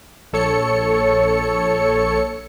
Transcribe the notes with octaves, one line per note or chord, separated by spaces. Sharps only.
A#1 A4 C#5 C#7